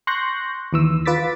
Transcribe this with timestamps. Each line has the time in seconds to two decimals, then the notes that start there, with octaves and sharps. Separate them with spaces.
0.07 C6 C#6 F#6 G6 A#6
0.73 D#2 E3 E6
1.06 F4 B4 D6 A6 B6